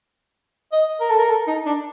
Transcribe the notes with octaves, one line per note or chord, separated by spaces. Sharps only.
D#5
A#4
A4
A#4
A4
D#4
D4